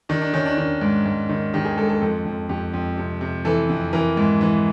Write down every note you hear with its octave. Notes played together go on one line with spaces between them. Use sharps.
D#3 D4
D4
D#3 C#4
D4
D#3
G#2
G#2
D#3
D#3 G4
G#4
G#2 A4
A4
F2 A4
F2
F2 G4
F2
C3
C3
E3 A4
F2
E3 A#4
G#2
E3